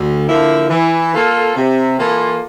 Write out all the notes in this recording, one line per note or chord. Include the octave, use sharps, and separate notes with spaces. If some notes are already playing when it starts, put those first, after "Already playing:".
Already playing: D2
D3 F3 A#3 E4
E3
A#3 F4 A4
C3
E3 A#3 F4 A4